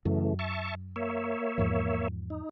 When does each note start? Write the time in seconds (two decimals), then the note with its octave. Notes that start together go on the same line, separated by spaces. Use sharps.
0.05 F#2 C#3 E3 A3
0.39 E5 A5 C#6
0.96 A#3 C#5 E5
1.58 E2 G#2 F3
2.30 D#4